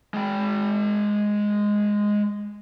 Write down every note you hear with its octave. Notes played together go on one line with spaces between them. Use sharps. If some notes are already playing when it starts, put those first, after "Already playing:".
G#3 G5